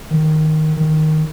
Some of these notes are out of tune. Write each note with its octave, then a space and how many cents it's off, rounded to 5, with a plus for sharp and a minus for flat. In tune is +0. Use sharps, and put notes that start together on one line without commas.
D#3 +0
D#3 +0